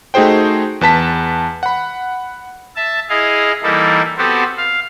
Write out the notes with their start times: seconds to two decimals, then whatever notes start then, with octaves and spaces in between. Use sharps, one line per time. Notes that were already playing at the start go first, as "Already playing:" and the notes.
0.14 A3 D#4 F#4 G#4 C5 G5
0.81 E2 B4 A5 B6
1.63 F#5 B5
2.76 E5 A5
3.09 E4 G#4 D#5 F5
3.63 E3 G3 A#3 D#4 E4 A4
4.18 B3 C4 F#4 G4 A4 C5
4.58 F5